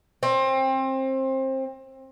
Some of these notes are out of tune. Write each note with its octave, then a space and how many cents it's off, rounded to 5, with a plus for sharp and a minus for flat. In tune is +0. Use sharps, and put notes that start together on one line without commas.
C4 +25